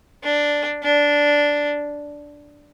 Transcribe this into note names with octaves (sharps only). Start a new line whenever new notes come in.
D4
D4